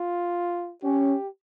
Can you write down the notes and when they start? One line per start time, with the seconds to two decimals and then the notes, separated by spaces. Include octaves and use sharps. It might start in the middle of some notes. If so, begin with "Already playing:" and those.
Already playing: F4
0.83 C#4 G4